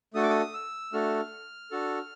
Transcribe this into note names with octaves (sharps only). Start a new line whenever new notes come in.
A3 D4 F#4 A4 D#6
D6
D#6
E6
A3 D4 F#4 A4 F6
D4 F#4 A4